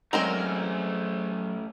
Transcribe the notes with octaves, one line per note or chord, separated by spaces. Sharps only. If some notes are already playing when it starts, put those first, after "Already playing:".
F#3 G#3 A3 C4 C#4 A#4 D5 A#5